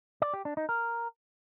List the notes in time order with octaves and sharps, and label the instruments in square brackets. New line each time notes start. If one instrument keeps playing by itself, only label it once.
[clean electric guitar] D5
G4
D4
D#4
A#4